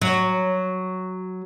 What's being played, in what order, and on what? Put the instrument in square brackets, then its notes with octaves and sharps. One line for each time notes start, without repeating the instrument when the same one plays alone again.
[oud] F#3